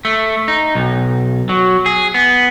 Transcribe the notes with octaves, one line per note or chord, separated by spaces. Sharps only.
A3
D#4
B1
F#3
G#4
B3